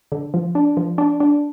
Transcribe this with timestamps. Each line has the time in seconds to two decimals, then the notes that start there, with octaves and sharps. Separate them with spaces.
0.12 D3
0.34 F3
0.55 D4
0.77 F3
0.98 D4
1.20 D4